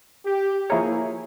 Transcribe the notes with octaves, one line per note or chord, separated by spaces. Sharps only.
G4
F3 A#3 E4 G#4 A#4 C#5